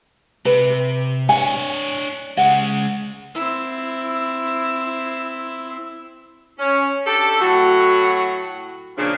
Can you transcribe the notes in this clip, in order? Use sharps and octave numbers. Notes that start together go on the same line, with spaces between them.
C3 B4
D4 C#5 G#5
C#3 G#3 F#5
C4 E4
C#4
D4 G4 A4
A2 F#3 F#4
A#2 C#3 F3 D4